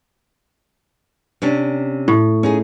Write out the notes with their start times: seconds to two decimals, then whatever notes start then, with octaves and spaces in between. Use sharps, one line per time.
1.42 C3 C#4 D4
2.08 A2
2.43 C#4 D#4 G#4